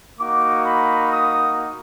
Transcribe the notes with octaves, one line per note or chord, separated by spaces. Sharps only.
A#3 D#4 F#4 D6
B5
D#6